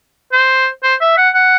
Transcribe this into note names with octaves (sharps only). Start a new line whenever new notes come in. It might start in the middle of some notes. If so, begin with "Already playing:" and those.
C5
C5
E5
F#5
F#5